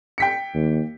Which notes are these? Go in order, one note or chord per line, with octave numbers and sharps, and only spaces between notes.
G5 B6 C#7
D#2